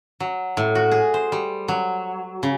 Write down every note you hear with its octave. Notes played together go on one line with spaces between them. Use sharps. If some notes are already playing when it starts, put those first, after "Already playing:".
F#3
A2
F#4
G#4
C5
G3
F#3
C#3